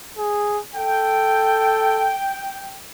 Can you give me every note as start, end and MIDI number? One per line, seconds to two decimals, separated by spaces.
0.17 0.59 68
0.75 2.14 69
0.75 2.77 79